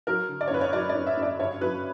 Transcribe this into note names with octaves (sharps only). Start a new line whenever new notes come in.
F#3 A#4
D3
D5
C#5
F#2 B4
C#5
F#3 D5
D5
F#2
E5
F#2
D5
G2 C#5
F#3 B4